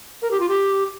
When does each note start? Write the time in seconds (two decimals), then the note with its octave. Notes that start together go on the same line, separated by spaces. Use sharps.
0.22 A#4
0.31 G4
0.40 F4
0.49 G4